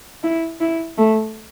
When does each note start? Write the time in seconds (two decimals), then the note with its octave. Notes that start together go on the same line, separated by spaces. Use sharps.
0.23 E4
0.61 E4
0.98 A3